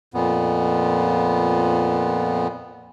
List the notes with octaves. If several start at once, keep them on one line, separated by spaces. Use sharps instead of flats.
F2 A#2 B3